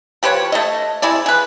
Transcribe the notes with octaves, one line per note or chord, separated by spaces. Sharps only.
F3 G4 B4 C#5
A3 D#5
C3 E4 G#4 D5
G#4 B4